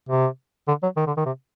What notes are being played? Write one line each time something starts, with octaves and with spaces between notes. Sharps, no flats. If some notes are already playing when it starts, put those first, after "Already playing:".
C3
D3
F#3
D#3
D3
D#3
C3